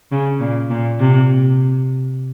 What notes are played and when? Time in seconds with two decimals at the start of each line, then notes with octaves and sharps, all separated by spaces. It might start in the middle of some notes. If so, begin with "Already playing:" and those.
0.11 C#3
0.40 A#2
0.70 A#2
0.99 C3